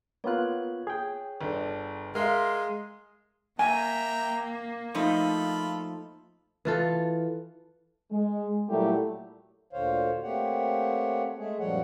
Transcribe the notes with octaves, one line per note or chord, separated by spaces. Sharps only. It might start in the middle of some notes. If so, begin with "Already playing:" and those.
A#3 B3 F4 C#5 F#6
G#4 G5
G1 D4 A4
G#3 A#4 E5 F5 C6 F6
A#3 E5 G5 G#5 A#5
F3 A3 D#4 F4 A4 B5
E3 F4 A4
G#3
A#2 F#3 G3 A3 E4 G4
D2 A#2 D3 C5 C#5 F5
A3 A#3 C4 G4 C#5 F#5
G#3 A3 G#4
F#2 A#2 F3 G3 C#5 F#5